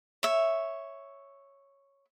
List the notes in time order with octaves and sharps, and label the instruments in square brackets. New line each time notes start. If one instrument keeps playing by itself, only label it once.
[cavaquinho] C#5 E5